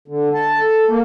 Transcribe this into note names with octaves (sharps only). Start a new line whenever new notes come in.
D3
A5
A4
A#3